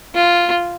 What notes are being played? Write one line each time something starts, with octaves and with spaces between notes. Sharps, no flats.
F4